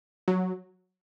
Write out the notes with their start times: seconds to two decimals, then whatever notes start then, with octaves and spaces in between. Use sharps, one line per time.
0.28 F#3